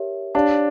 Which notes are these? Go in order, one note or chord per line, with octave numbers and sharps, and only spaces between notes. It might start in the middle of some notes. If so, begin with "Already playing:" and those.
Already playing: G4 A#4 C#5 E5
D4 G4 C#5 F5 A5